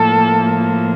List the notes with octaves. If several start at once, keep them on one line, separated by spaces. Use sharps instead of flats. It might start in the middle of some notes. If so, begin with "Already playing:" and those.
Already playing: A2 F3 A#3 A4